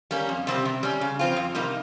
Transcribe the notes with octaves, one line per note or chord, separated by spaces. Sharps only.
G3 A#3 C#4
F2
C3 G3 C4 G4
C3
G3 C#4
C#3
F3 C4 F4
F2
C3 G3 A#3 D#4